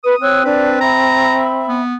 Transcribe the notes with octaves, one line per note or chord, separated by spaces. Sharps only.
B4 D#6
C4 C#5 E6 F#6
D4 B4 D5
E5 A#5 B5
B3